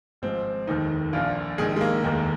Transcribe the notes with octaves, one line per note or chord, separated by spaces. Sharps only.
G#1 G#2 F3 C4
F1 D#2 D#3 D#4
A#1 A#2 F3 F4
A#1 G#2 D#3 G#4
G#3
A#3
F1 D#2 D#3 A#3